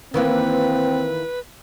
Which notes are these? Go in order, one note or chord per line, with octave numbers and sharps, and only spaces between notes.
D#3 E3 A#3 C4 B4